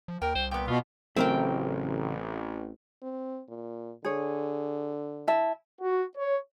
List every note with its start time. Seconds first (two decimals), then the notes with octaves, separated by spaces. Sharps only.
0.08 F3
0.22 D#2 A#4 G5
0.35 C2 C5
0.51 A#2 B3 G5
0.68 B2 F4
1.17 A1 C#3 F#3 A3 C4 A#4 G5
3.02 C4
3.49 A#2
4.05 D3 G#4 C#5
5.27 E4 E5 A5
5.80 F#4
6.17 C#5